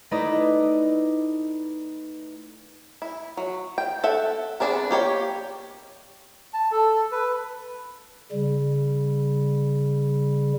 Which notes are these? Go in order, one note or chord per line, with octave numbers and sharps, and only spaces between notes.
A3 D#4 E4 B4 D5 D#5
E4
F#3
G5
A4 E5 F#5
B3 C4 D4 G#4 A#4
A#3 G4 C#5 G5
A5
A4
B4
C#3 G3